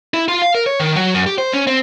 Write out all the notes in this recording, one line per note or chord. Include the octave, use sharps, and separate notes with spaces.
E4
F4
F5
A#4
C#5
D#3
F#3
F#2
G4
C5
C#4
C4